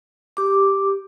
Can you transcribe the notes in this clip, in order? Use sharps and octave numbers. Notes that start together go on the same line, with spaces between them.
G4 D6